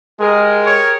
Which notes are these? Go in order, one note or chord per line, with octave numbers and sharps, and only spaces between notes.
G#3 G4 G#4 A#4
C#5